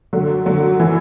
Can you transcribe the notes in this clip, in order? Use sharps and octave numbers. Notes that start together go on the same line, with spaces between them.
D3 F#3
D3 F#3
E3